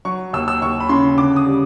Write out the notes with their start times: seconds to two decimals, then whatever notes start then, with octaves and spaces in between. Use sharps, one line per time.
0.05 F#3 C#6
0.33 D#2 E6
0.48 E6
0.61 D#2 C#6
0.80 B5
0.89 C#3 C6
1.18 D3 D6
1.36 D#6
1.46 G3